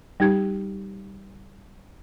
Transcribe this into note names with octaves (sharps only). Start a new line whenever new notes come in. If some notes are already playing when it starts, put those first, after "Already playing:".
G3 D#4 G4 G#6